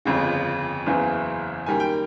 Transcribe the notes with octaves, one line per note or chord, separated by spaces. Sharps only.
G1 F2 C#3
F#1 E2 C#3 E3
F#2 D#3 G3 A#3 G#5
G5